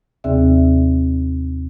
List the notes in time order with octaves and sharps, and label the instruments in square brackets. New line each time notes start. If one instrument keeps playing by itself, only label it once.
[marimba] D#2 C3 C4 G#4 D5 E5